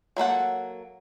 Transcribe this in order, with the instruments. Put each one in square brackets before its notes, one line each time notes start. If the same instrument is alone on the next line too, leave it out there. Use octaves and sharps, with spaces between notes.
[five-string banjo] F#3 A#3 A4 F#5